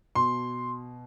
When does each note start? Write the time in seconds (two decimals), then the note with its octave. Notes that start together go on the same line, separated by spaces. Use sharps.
0.15 B2 C6